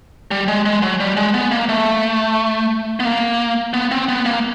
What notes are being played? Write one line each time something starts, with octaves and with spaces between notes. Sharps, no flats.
G3
G#3
G#3
F#3
G3
G#3
B3
A#3
A3
B3
A#3
B3
C4
B3
A#3